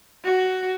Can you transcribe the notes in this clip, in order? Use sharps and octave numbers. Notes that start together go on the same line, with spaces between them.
F#4